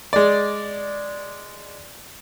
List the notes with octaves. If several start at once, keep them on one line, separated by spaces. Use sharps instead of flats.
G#3 D5